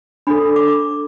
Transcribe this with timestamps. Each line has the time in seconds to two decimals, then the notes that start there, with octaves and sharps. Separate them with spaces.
0.27 D4 A4 B5
0.56 D6